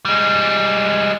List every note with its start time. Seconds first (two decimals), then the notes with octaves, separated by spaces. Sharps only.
0.05 G3 G#3